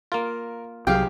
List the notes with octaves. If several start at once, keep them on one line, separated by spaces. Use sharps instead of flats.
A#3 F4 A#4
C2 F#3 G4 G#4 F5 G5